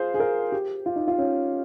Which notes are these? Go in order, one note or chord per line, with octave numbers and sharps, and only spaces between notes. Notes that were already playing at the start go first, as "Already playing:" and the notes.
Already playing: F4 G#4 C5
G#4
A#4
G4
F4
D#4
F4
C#4